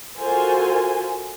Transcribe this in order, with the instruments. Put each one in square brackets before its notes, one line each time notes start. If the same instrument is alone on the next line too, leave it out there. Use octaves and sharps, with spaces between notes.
[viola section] F4 F#4 A4 A#4 C5 G#5